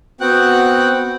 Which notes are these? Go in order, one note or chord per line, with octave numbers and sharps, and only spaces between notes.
B3 C4 F#4 F#5 G5 F#6